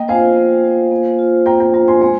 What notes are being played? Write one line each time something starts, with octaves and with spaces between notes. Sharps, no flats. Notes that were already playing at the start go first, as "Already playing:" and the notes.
Already playing: A#3 D#5 G5
F4 C5 F5 G#5
A#3
F4 C5
A#3
F4 C5
A#3 G5 A#5
G5 A#5
F4 C5 G5 A#5
G#5 C6
G#3 G#5 C6